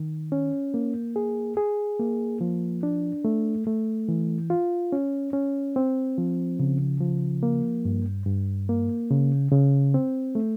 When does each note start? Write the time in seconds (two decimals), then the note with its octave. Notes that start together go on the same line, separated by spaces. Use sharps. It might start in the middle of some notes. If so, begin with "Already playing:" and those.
Already playing: D#3
0.32 C#4
0.74 A#3
1.16 G#4
1.57 G#4
2.00 A#3
2.41 F3
2.83 D4
3.25 A3
3.67 A3
4.09 E3
4.50 F4
4.92 C#4
5.33 C#4
5.76 C4
6.18 F3
6.59 C#3
7.00 F3
7.43 A#3
7.85 G2
8.26 G2
8.69 A#3
9.11 C#3
9.51 C#3
9.94 C4
10.35 A3